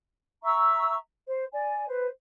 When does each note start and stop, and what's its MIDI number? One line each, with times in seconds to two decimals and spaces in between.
0.43 0.95 76
0.43 0.95 82
0.43 0.95 85
0.43 0.95 88
1.27 1.44 72
1.53 1.85 74
1.53 1.85 80
1.88 2.07 71
1.88 2.07 72